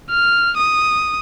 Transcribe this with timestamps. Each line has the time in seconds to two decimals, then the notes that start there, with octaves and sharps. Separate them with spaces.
0.10 F6
0.57 D#6